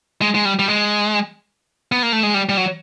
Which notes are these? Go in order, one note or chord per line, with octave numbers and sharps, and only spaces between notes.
G#3
G#3
G3
G3
G#3
B3
A#3
A3
G#3
G3
G3
F#3